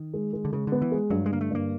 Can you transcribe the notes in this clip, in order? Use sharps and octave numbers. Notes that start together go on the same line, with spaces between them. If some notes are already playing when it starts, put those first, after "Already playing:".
Already playing: D#3
G#3
G#3
D3
C#3 G#3
D3 B3
E3
G#3
G2 F#3
G#3
D3 A#3
A3
G2 A#3